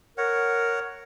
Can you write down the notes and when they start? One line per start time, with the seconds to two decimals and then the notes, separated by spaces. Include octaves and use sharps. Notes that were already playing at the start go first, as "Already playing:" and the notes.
0.18 A#4 C#5 F#5